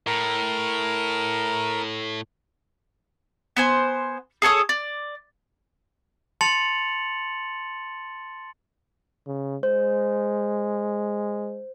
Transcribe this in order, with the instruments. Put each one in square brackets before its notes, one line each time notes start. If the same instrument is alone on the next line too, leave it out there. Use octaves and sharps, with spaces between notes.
[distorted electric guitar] A2 [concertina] A#4 A#5
[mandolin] B3 C5 G#5
G#4 A4 C#5 D#6
D5
[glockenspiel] A5 C6 A6 C#7 F7 F#7
[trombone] C#3
[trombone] G#3 [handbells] C5